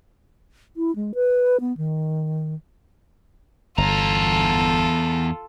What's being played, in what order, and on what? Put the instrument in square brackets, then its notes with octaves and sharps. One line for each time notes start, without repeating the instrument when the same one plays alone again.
[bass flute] E4
G#3
B4
B3
D#3
[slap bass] G1 [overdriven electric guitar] E2 A#5 [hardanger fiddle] F4 A4